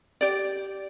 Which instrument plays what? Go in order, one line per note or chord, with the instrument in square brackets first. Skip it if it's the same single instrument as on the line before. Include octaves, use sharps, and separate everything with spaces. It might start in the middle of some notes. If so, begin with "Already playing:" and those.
[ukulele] G4 D5